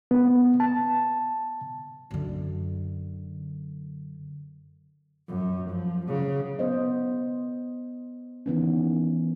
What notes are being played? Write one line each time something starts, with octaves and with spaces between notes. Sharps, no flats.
B3
A5
F#2 D3
F#2
F3
C#3 F#3
B3 C5 D#5
D#3 E3 B3 C#4